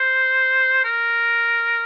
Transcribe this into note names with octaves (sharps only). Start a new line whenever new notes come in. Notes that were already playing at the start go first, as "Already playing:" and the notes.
Already playing: C5
A#4